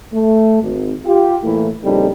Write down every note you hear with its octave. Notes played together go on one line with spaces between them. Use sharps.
A3
G#1
F4 G4
A2 E3 A3 A#3 E4
A#1 C#3 G3 C4 D#4 A4